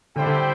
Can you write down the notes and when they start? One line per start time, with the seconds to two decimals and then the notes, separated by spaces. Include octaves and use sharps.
0.16 D3 G3 E4 C5 G5
0.26 D3